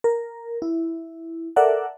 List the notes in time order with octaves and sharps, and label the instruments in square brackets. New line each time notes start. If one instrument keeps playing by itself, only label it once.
[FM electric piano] A#4
E4
A4 A#4 D5 E5 F#5